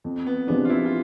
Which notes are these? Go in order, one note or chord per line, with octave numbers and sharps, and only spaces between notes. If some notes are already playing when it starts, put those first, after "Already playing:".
F2
B3
C3 F3 G#3 B3 D4
F4
E4
F4